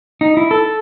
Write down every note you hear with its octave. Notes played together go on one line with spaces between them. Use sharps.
D#4
E4
A4